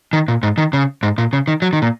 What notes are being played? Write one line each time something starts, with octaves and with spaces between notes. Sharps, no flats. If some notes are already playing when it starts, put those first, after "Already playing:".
D#3
A#2
G#2
D#3
C#3
G#2
A#2
C#3
D#3
F#3
D#3
A#2